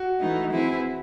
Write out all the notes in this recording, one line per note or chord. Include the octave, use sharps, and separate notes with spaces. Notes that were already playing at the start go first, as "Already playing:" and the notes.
Already playing: F#4
E3 A3 D#4
E3 C4 E4 G#4